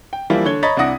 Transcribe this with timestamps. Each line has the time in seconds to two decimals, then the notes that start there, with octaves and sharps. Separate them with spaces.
0.13 G5
0.30 E3 F3 G3 A#3 E4 F4
0.45 D3 C#5 G#6 G7
0.63 C#5 D#5 A#5 B5 A6 B6
0.77 C2 D4 E4 F#5 D#6 A#6